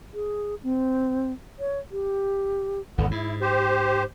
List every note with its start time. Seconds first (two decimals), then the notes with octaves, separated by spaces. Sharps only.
0.14 G#4
0.63 C4
1.59 C#5
1.91 G4
2.98 G#1 E2 D3 B3
3.11 G#2 E4
3.41 G4 C5